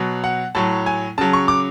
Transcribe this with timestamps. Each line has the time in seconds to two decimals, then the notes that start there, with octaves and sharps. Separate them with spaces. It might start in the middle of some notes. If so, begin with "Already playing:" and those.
Already playing: B2 F#3
0.24 F#5
0.55 A2 F#3 A5
0.86 G#5
1.18 C#3 F#3 A5
1.33 C#6
1.48 D6